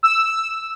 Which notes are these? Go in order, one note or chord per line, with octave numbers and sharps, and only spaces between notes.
E6